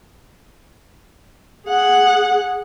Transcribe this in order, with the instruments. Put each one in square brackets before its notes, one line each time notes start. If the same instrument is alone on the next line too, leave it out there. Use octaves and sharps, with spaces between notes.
[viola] G#4 F#5